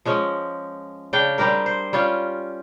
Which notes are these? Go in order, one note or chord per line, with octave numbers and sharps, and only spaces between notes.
F3 G#3 C#4
C#3 D4 F5 G5
G3 C4 G4 A#4
C5
G3 C#4 F4